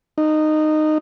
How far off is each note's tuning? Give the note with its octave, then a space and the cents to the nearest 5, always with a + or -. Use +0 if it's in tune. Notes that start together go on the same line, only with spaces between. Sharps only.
D#4 -15